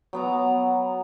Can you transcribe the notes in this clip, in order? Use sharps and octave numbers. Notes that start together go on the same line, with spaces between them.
F#3 B3 A#5